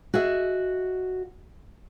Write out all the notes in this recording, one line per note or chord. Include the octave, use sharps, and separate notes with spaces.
F#4 G#4 D#5 E5